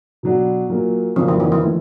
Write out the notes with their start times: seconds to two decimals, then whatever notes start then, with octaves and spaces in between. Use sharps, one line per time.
0.23 B2 F#3 B3 D4 F#4
0.70 A#2 F#3 A#3
1.16 F2 C#3 F3 F#3 A#3 D4
1.28 E3
1.40 D#3
1.52 E3
1.63 F3 A3